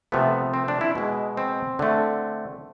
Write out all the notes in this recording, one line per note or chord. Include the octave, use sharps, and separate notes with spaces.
C3 F3 A3 B3
C4
D4
E4
B2 G#3
C4
D3 A3